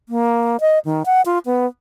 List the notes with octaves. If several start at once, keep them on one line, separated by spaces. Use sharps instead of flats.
A#3
D#5
D#3
F#5
F4
B3